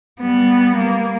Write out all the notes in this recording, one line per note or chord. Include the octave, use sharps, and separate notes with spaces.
G3 B3
A#3